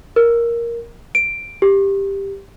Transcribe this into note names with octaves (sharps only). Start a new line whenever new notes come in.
A#4
D7
G4